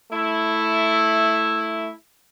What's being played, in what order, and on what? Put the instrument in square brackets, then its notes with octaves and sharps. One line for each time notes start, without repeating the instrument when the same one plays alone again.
[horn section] A3 E4